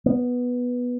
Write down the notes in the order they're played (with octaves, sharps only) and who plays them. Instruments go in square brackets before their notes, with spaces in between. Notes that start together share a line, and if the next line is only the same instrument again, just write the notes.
[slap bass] B3